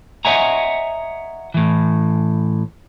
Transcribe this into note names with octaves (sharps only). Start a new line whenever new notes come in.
C#5 D#5 E5 F#5 G#5 A#5
A2 E3